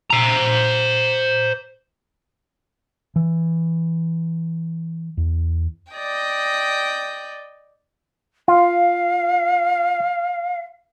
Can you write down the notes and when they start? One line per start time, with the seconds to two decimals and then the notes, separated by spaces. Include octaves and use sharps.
0.10 C5 A#5
3.16 E3
5.17 E2
5.93 D5 D#5 G5
8.48 F4 F5